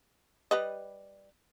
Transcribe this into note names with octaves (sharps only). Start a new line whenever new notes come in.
G3 B4 D#5